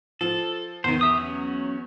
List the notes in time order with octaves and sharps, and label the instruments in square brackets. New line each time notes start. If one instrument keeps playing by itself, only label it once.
[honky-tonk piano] F3 [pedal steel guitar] A4
[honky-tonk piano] E2 [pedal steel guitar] D#3 C5
[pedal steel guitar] G4 E5 D#6
F#3 C#4